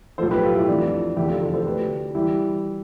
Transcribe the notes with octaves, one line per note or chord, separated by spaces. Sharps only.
B1 A2 F3 A4 C5
G4 B4
F4 A4
E4 G4
F2 E3 A3 D4 F4
F1 E2 D3 A3 E4 G4
F4 A4
F4 A4
A4 C5
D2 D3 A3 G4 B4
E3 G3 E4 G4